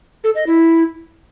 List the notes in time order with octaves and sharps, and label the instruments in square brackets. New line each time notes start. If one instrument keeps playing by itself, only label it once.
[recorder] A4
D#5
E4